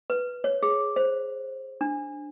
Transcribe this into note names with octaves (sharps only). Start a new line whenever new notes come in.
B4
C#5
G#4
C5
D4